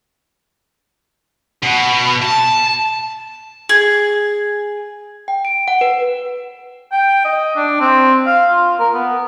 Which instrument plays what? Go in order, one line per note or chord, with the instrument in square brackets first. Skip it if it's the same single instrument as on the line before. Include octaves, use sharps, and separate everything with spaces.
[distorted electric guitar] B2
A5
[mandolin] G#4
[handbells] G5
D7
F#5
B4
[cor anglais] G5
D#5
D4
C4
F5
F4
A#4
B3